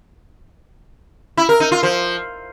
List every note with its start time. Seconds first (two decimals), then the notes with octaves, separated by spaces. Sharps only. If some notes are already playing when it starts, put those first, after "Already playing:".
1.37 E4
1.49 A#4
1.60 D#4
1.72 F4
1.83 F3